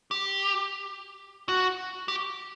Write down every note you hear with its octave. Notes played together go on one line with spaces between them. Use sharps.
G4
F#4
G4